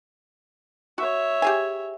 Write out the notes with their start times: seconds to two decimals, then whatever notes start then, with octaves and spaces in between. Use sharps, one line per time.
0.98 F#4 C#5 E5
1.42 G4 G#4 G#5